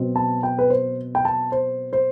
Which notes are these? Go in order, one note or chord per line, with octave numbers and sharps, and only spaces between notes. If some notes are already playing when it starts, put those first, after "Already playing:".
Already playing: B2 F#3 C4
A5
G5
B4
C5
G5
A5
C5
C5